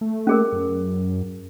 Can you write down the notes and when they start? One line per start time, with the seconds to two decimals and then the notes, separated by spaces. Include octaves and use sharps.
0.01 A3
0.27 C#4 G#4 A#4
0.53 F#2